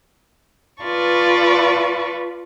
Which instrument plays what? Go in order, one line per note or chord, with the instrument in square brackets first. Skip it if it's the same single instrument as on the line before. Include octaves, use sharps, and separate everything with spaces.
[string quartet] F4 B4 D5 A5 C#6